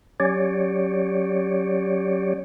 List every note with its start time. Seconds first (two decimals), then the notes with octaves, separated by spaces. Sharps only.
0.20 F#3 C#4 G4 C#5 D5